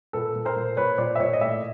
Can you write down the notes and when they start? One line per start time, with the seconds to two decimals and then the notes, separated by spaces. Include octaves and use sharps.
0.13 A#2 A4 B4
0.36 A#2
0.45 A#4 C5
0.56 A#2
0.77 A#2 B4 C#5
0.98 A#2 C5 D5
1.15 E5
1.20 A#2 C#5 D#5
1.33 D#5
1.41 A2 D5 E5